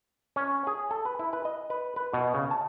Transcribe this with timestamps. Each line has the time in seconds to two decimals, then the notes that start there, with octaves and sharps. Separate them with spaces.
0.36 C#4
0.67 G#4
0.91 A4
1.05 B4
1.19 E4
1.33 B4
1.45 D#5
1.70 B4
1.96 B4
2.13 B2
2.34 C#3
2.51 A5